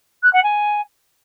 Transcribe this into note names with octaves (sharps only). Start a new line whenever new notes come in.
F#6
F#5
G#5